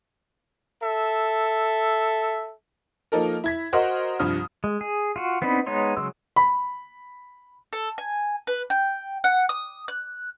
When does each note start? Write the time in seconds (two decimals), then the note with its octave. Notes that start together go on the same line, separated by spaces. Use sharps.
0.81 A4 E5
3.12 F3 A#3 D#4 A4 A#4
3.44 E4 G#6 B6
3.73 F#4 A#4 C5 D#5 F#5 C6
4.19 C2 G2 F3 D#6 F6
4.64 G#3
4.81 G#4
5.16 F4 F#4
5.42 B3 C4 D4 D#4 B5
5.66 G#3 B3 D#4 C#5 C6
5.97 C#3 F#3 G#3 C6 E6
6.36 B5
7.73 A4
7.98 G#5
8.47 B4
8.70 G5
9.24 F#5
9.49 D#6
9.88 F#6